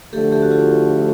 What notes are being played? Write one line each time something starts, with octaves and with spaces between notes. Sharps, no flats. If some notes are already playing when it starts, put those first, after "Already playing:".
D2 D3 F3 A3 G4 A4
G4 A4
F#4
F4 G4